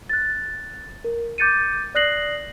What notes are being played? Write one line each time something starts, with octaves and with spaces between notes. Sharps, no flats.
F#6 A6
A#4
D6 G6 A6 C#7 D#7
D5 D#6 F#6 A#6 C7 F#7